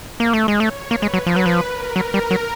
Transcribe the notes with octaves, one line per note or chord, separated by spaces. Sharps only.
A#3
A3
G#3
A3 C#5
A#3 B4
G#3
F#3
F3
F#3
F3
A#4
F#3
G3
F#3